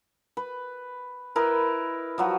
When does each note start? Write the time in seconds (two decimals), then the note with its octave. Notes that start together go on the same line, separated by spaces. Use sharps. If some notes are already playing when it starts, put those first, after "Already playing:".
0.37 B4
1.36 E4 A#4 B4 D#5
2.18 F3 F#3 F#4